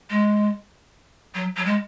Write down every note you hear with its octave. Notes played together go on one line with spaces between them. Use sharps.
G#3
F#3
F#3
G#3